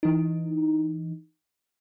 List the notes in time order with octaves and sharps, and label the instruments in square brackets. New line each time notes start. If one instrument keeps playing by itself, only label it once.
[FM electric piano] E3 D#4